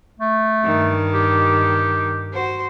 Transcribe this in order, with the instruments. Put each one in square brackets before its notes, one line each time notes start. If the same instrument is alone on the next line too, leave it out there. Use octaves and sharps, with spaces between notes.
[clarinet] A3
[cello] G2 D#3
[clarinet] G4
[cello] F#4 C5